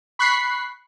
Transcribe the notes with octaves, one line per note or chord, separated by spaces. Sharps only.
B5 C#6 F#6 B6 C7